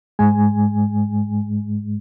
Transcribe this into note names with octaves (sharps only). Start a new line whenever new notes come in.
G#2 G#3 G#5